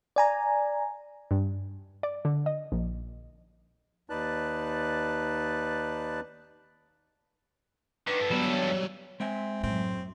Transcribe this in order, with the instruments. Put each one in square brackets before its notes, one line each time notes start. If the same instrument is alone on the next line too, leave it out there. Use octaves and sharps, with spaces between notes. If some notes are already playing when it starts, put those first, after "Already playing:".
[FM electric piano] D5 G#5 A#5
[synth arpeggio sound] G2
D5
D3
D#5
A#1
[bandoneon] D#2 D#4 B4 D5 A5 F#6
[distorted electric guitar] D3 D#3 [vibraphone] B4
[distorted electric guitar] G2 A4
[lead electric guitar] F#3 G3 [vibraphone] B3
[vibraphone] C#5
[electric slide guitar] G#3 E5 G#5 [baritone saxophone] C4
[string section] F#2 [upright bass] A2 [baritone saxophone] C4